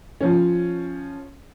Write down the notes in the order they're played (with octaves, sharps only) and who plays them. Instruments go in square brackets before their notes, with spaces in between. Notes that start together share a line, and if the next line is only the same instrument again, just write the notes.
[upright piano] F3 C#4